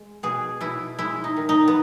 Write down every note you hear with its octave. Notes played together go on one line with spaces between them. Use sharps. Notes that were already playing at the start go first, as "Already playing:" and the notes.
Already playing: G#3
B2 G#4
B2 E4
G#3 E4
D#4
D#3
D#4
B3